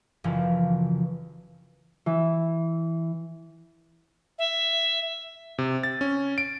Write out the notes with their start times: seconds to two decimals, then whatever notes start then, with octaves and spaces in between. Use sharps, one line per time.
0.24 F#1 E3 F3
2.06 E3
4.39 E5
5.58 C3
5.83 A6
6.01 C#4
6.38 D7